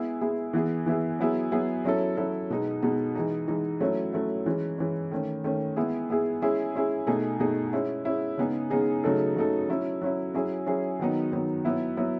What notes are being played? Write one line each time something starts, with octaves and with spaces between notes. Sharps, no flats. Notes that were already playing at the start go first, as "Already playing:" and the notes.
Already playing: G#3 B3 E4 G#4
G#3 B3 E4 G#4
E3 B3 E4 G#4
E3 B3 E4 G#4
F#3 B3 E4 G#4
F#3 B3 E4 G#4
F#3 C#4 E4 A4
F#3 C#4 E4 A4
B2 G#3 B3 D#4
B2 G#3 B3 D#4
E3 G#3 D#4
E3 G#3 D#4
F#3 A3 C#4 E4
F#3 A3 C#4 E4
E3 G#3 C#4
E3 G#3 C#4
D#3 A3 C#4
D#3 A3 C#4
G#3 B3 E4 G#4
G#3 B3 E4 G#4
G#3 C#4 E4 G#4
G#3 C#4 E4 G#4
B2 A3 D#4 G#4
B2 A3 D#4 G#4
G#3 C#4 E4
G#3 C#4 E4
C#3 G#3 B3 D#4 G#4
C#3 G#3 B3 D#4 G#4
C#3 F#3 A3 D#4 A4
C#3 F#3 A3 D#4 A4
F#3 C#4 E4
F#3 C#4 E4
F#3 C#4 E4 G#4
F#3 C#4 E4 G#4
D#3 F#3 B3 D#4
D#3 F#3 B3 D#4
F#3 B3 E4
F#3 B3 E4